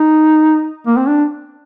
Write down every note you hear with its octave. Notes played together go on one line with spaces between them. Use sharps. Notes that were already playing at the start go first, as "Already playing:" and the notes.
Already playing: D#4
A#3
C4
D4